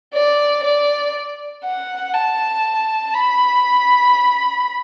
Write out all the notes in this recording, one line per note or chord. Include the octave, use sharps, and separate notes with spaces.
D5
D5
F#5
A5
B5